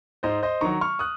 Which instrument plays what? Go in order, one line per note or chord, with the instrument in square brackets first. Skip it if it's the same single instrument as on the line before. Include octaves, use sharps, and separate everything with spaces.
[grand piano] G#2 C5 D#5
C5 D#5
D#3 F#3 A#5 C#6
C#6 F6
D#6 F#6